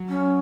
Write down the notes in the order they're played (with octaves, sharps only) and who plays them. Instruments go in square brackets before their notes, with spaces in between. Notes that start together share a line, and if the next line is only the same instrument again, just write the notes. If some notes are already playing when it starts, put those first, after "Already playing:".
Already playing: [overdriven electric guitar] F#3
[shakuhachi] C#4